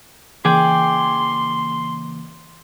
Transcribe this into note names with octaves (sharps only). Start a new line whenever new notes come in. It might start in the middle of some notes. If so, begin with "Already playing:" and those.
C#3 E3 A#3 G#4 D5 G5 C6